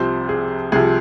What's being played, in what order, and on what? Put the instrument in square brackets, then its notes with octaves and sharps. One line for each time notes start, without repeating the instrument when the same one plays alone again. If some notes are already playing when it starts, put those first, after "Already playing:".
Already playing: [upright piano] C2 C3 F3 C5
G#4
C2 C3 F3 G#4